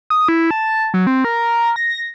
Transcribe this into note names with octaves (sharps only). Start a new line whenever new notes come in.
D#6
E4
A5
F#3
C4
A#4
A#6